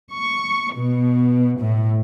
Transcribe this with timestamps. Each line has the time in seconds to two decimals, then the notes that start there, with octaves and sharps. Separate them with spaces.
0.11 C#6
0.75 B2
1.59 A2